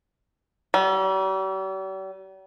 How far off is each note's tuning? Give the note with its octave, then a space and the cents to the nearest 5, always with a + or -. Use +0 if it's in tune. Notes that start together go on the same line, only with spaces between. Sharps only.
G3 -45